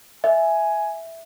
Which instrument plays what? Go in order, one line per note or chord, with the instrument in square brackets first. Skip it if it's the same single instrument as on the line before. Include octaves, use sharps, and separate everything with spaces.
[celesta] E5 [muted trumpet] G#5